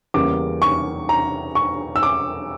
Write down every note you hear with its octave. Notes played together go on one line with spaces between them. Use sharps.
E2 C#3 G3 A#3 D6
C#6
A#5
C#6
E6
D6